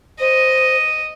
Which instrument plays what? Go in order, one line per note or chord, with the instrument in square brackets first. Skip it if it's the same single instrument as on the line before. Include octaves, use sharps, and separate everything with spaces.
[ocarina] C5 [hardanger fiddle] D#5